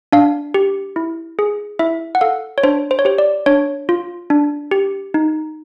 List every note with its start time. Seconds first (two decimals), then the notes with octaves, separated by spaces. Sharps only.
0.12 D4 F5
0.54 G4
0.96 E4
1.39 G#4
1.79 E4 E5
2.15 F#5
2.21 A4 F5
2.58 C#5
2.63 D4 C5
2.91 C5
2.99 C#5
3.05 G4 C5
3.18 D5
3.46 D4 C#5
3.89 F4
4.30 D4
4.71 G4
5.14 D#4